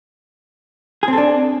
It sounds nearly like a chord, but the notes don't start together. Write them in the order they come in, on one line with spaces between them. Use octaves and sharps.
G#4 C4 A4 D4